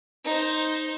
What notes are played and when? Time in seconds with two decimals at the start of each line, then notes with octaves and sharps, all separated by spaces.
0.25 D#4 C5